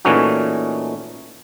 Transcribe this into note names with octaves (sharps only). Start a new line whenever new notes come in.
A#2 E3 A3 C#4 D#4 F#4